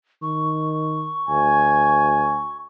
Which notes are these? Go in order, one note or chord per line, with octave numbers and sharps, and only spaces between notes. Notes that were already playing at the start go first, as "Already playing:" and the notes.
D#3 C#6
D2 G#5